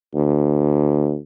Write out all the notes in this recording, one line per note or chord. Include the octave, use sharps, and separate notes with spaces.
D2